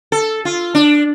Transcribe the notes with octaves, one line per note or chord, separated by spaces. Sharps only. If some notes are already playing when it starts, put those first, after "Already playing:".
A4
F4
D4